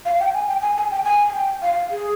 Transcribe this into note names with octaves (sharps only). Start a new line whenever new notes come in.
F5
G5
G#5
G5
G#5
G#5
G5
G#5
G#5
G5
F5
G#4